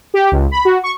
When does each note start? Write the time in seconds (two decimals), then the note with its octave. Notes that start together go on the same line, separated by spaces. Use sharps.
0.14 G4
0.32 C#2
0.51 B5
0.65 F#4
0.84 C#6